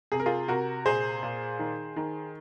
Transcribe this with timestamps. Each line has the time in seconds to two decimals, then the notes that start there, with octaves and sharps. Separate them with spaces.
0.12 C3 G#4
0.20 A#4
0.26 F4 G#4
0.48 C3 F#4 A#4
0.86 A#2 G#4 C5
1.23 A#2
1.59 D#3
1.96 D#3